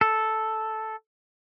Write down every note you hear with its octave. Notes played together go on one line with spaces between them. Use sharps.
A4